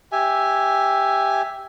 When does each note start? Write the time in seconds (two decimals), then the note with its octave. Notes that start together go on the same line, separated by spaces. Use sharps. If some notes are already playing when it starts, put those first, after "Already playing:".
0.12 G4 E5 G#5